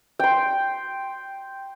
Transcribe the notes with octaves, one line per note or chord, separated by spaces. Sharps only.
G5 C6